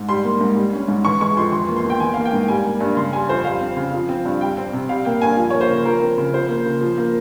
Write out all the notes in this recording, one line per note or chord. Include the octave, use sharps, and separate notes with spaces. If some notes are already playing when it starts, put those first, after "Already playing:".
Already playing: G#2
G3 C6
A#3
G#2
G3
C#4
G#2
E3 C#6
G#3 C#6
F2 C6
E3 C6
A#3
C6
E2
G5
E3 G#5
A#3 F5
G5
G#2
G3 G#5
A#3
G2
C#3 C6
G3 G#5
F2 C5
G3 F5
C4
C#3
F3
C4
G2
G3 G5
C4
C3
G3 F5
A#3 G5
G2 G#5
F3
A#3 C#5
C5
C#3
F3 A#4
C4
C#3
F3 C5
A#3
C#3
F3
A#3